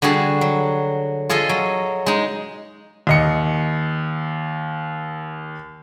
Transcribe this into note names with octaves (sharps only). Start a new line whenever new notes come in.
D3 G3 F#4 G#4 A5
F#3
F4 G#4 A4 D#5
F#3
G#3 D#4
D#2 D#5 C#7